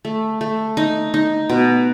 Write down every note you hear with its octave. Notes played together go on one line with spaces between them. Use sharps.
A3
A3
D#4
D#4
B2